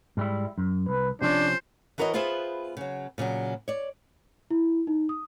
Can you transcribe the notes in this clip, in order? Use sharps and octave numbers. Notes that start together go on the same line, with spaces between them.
G#2 G3 E4
F#2
C2 B4
C3 F3 C#4 D4 C5
E3 F#4 A#4 B4 C#5 D#5
B3 F4 G#4 B4 C5 E5
C#3 F#3
A#2 C#3 F3 F#3
C#5 D5
E4
D#4
D#6